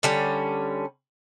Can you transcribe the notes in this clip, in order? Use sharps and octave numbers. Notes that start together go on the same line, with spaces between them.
D3 G3 C#4